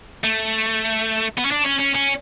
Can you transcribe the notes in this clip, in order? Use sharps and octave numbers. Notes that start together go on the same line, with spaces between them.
A3
B3
C#4
D4
C#4
C#4
C#4